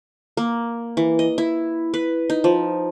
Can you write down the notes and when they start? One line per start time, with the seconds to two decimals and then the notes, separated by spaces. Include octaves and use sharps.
0.37 A#3
0.97 E3
1.19 D#5
1.38 E4
1.94 B4
2.30 D#4
2.44 F3